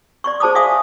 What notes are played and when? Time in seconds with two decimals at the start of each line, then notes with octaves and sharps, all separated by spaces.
0.24 D5 C6 C#6
0.40 G#4 C5 A5 B5 D6 D#6
0.55 D5 E5 F5 G#5 C6 D#6